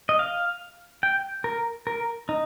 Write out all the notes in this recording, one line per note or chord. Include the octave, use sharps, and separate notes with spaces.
D#5
F5
G5
A#4
A#4
D#4